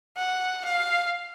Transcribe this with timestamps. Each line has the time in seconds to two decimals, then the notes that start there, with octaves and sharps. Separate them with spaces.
0.17 F#5
0.65 F5